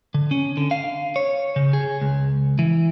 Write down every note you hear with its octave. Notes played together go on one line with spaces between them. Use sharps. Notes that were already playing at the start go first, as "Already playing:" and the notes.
D3
C#4
D3
F5
C#5
C#3
G#4
C#2
E3